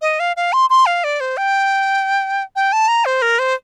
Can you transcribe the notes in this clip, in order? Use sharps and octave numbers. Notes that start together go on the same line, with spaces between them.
D#5
F5
F5
C6
C6
F5
D5
C5
G5
G5
A5
A#5
C5
A#4
C5